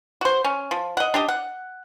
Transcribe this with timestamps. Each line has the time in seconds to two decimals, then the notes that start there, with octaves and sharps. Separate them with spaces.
0.21 F#4 C5
0.44 C#4
0.71 F3
0.97 D#5 F#5
1.14 D4 G4 D#5
1.28 F#5